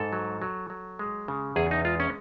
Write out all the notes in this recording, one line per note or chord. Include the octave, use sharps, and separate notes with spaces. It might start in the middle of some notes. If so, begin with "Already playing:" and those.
Already playing: G#2 A4
F#3
F#3
F#3
G#3
C#3
E2 G#4
D#4
G#3 F4
C#4